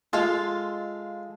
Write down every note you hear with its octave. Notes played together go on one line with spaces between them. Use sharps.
G#3 F4 A4 F5